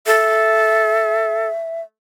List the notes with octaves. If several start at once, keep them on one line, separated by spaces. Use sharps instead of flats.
A4 E5